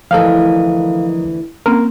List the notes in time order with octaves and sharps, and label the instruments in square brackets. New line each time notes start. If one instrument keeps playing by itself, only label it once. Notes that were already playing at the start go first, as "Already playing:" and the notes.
[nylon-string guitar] D2 E3 [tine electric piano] F3 A#4 D#5 [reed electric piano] A4 F5
[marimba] A#3 C4 C#4 [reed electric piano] A#4